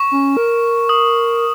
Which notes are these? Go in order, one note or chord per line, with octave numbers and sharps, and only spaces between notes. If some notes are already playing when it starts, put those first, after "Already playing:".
Already playing: C#6
C#4
A#4
D#6